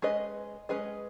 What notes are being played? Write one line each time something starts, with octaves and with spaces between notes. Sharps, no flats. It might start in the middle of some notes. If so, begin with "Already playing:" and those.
G#3 C#4 G#4 B4 D#5
G#3 C#4 G#4 B4 D#5